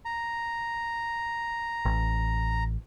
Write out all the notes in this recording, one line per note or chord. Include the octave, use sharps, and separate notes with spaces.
A#5
A1